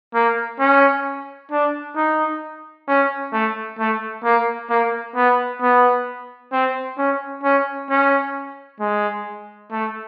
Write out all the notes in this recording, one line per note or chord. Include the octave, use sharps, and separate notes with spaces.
A#3
C#4
D4
D#4
C#4
A3
A3
A#3
A#3
B3
B3
C4
C#4
C#4
C#4
G#3
A3